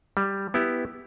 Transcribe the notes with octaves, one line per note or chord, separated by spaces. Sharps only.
G3
B3 E4 G4